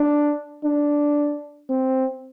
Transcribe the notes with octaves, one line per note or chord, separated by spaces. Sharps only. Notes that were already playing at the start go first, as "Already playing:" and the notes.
Already playing: D4
D4
C4